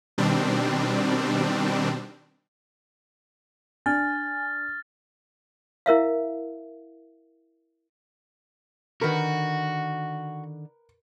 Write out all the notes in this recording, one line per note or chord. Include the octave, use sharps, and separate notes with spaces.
B2 D#3 G3 C4 D4
D4 G#5 F6 A6
E4 A#4 E5 F5
D3 D#3 F#4 A#4 B4